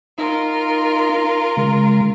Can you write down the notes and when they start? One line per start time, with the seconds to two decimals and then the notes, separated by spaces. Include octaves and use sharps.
0.18 D#4 F4 A#4
1.57 C#3 G#3